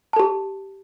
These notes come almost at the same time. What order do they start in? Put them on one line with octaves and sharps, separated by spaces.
A5 A4 G4